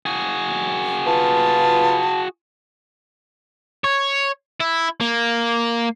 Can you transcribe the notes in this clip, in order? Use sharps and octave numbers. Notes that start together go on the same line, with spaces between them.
F#4 G#4
F4 B4 A5
C#5
E4
A#3